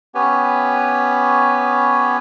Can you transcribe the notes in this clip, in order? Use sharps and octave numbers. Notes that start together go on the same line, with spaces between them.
B3 C#4 G4 B4 C#5